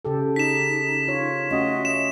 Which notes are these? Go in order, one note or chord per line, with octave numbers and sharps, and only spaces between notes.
C#3 G4 A4
D#4 B6 E7
F4 C#5
A3 C#4 F#4 D#5
E7